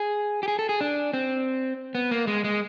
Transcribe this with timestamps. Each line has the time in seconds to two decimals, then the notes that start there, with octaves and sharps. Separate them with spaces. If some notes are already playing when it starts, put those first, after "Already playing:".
Already playing: G#4
0.43 G4
0.48 G#4
0.59 A4
0.69 G#4
0.81 D4
1.13 C4
1.95 B3
2.11 A#3
2.27 G#3
2.44 G#3